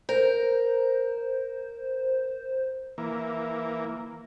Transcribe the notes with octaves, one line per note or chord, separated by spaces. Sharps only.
A#4 C5
E3 A#3